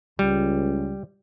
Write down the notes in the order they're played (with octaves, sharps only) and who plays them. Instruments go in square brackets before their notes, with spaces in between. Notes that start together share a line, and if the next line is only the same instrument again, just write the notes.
[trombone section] C#2 [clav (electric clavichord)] G3